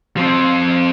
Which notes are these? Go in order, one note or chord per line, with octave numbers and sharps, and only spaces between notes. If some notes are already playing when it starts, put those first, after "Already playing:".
F3 C4